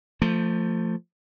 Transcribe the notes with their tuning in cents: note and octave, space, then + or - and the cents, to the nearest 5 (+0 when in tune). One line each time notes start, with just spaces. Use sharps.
F3 +0 A3 +25